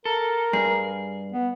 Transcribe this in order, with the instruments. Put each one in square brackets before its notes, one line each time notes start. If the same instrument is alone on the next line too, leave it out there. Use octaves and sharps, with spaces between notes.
[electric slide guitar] A4 [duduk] A#4
[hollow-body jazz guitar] G2 [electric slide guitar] G#4
[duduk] B3